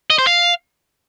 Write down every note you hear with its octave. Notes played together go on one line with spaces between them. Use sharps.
D#5
C5
F5